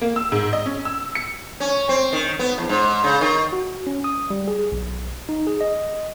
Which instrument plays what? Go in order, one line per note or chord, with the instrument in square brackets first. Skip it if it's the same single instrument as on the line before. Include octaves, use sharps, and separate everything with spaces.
[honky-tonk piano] A#3
E6
G#2
D#5
C#4
E6
C#7
[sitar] C#4
C4
D#3
B3
E2
G#2
C#3
D#3
[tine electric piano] F#4
C#4
D#6
G3
G#4
B1
D#4
G#4
D#5